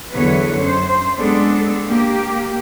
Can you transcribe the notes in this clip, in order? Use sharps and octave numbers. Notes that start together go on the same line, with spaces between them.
E2 D3 F#3 B4 C#5
F#2 C5
G#3 B3 C4 D4 A4
A#3 G4